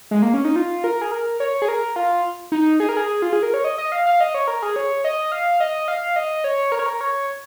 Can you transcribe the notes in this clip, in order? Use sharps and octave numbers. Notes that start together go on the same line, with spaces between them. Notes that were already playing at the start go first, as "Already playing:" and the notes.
G#3
A#3
C#4
D#4
F4
A#4
G#4
A#4
C#5
G#4
A#4
F4
D#4
G#4
A#4
G#4
F4
G#4
A#4
C#5
D#5
D#5
F5
F5
D#5
C#5
A#4
G#4
C#5
D#5
F5
D#5
F5
D#5
C#5
A#4
C#5
A#4
C#5